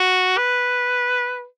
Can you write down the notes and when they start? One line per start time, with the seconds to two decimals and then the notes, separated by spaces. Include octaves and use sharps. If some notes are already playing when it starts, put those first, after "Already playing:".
Already playing: F#4
0.38 B4